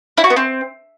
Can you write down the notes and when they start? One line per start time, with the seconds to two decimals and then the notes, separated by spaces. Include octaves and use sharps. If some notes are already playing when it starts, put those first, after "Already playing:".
0.18 E4
0.24 F#4
0.30 B3
0.36 C4